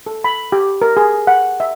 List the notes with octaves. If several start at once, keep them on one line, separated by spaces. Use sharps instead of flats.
A4
B5
G4
A#4
G#4
F#5
E5